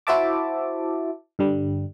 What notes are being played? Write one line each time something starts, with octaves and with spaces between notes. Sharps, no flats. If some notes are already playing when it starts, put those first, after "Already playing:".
E4 F#4 C5 E5 A5 D6
G2 D3 G3